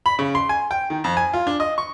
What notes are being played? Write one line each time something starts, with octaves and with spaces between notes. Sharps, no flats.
B5
C#3
C6
G#5
G5
D#3
F2
G#5
F4
D4
D#5
C#6